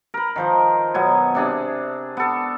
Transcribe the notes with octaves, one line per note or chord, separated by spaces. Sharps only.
A#4 B4
D#3 F3 C5
B2 F#3 B3 G#5
C3 D4 G#4
B3 A4